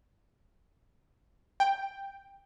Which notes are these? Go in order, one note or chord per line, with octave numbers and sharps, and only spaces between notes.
G5